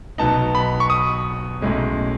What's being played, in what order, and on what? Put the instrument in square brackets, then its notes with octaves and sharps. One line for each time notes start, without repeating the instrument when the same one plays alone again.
[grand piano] B1 B2 F#3 B3 D#4 [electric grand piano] A5
[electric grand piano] B5
C#6
D#6
[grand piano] B1 A2 G#3 C#4